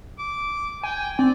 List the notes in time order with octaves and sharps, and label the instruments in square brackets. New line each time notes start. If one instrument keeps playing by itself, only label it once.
[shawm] D6
[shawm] G5 [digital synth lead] G#5
[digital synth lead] C4 [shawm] D5